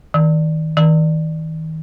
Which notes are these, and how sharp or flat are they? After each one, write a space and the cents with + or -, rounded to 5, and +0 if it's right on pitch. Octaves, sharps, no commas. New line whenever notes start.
D#3 +25
D#3 +35